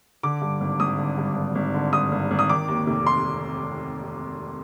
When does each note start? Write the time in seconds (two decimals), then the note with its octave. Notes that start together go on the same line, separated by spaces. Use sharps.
0.23 D3 D6
0.42 G2
0.61 G#1
0.80 G#1 D#6
0.98 D3
1.18 G2
1.36 G#1
1.55 G#1
1.74 D3
1.93 G2 D#6
2.12 G#1
2.31 G#1
2.39 D#6
2.49 D#3 D6
2.68 D#2
2.87 F1
3.07 C6